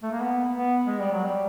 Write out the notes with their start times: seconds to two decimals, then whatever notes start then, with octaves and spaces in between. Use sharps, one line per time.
0.03 A3
0.12 A#3
0.21 B3
0.53 B3
0.86 G#3
0.99 G3
1.12 F#3
1.25 G3